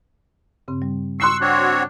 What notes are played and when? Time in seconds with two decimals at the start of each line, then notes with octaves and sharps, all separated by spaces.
0.68 G2 C#3 C4
0.82 G3
1.20 C6 C#6 E6 F#6 C7
1.41 C4 D4 F#4 C#5